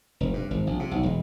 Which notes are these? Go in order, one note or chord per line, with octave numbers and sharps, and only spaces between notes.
F1
G2
G#1
A#1
C3
B1
E1